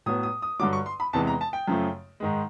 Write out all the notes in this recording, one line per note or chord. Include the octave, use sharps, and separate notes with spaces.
A2 F#3 B3 D#6
D#6
D#6
G2 D3 F#3 D6
C#6
C6
B5
E2 C3 E3 G#3 A5
A#5
A5
G5
F#2 C#3 F3 A3
G#2 D#3 G#3